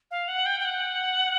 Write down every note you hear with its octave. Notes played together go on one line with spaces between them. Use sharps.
F5
F#5
G5
G5
F#5